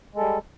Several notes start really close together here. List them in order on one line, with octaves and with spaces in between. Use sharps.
G#3 A4 G3